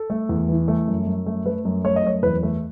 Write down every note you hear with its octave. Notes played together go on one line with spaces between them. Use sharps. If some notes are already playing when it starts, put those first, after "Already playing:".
Already playing: A4
A3
E2
E3
A3
F#2
F#2
A3
A3 B4
F#2
A3 C#5
D#5
F#2 C#5
E2 B4
A3